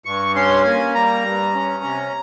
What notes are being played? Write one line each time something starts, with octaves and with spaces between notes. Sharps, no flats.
G2 C#6
C#4 C6
A#3 G#5
G3 A#5
G2
C#4
C3